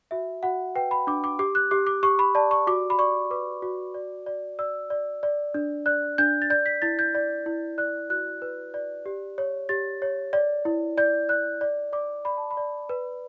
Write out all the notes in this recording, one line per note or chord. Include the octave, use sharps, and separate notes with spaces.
F#4 E5
F#4 F#5
B4 G5
B5
D4 D6
D6
G4 D6
F#6
G4 D6
D6
G4 C#6
B5
D5 A5
C#6
F#4 D6
B5
D5 C#6
B4 D6
F#4
D5
D5
D5 E6
D5
D5
D4
D5 F#6
D4 G6
A6
D5 G6
B6
E4 A6
G6
D5
E4
D5 F#6
F#4 F#6
B4
D5
G4
C#5
G4 A6
C#5
D5
E4
D5 G6
D5 F#6
D5
D5 D6
D5 B5
A5
B5
D5
B4